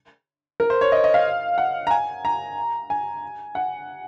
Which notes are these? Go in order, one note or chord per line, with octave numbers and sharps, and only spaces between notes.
A#4
C5
C#5
D#5
D#5
F5
F#5
A#5
G#5
A#5
G#5
F#5